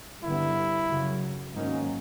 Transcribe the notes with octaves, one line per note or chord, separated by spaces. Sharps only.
G2 D3 G3 B3 E4
F#2 C#3 F#3
G#2 D#3 F#3 A#3 C#4 D#4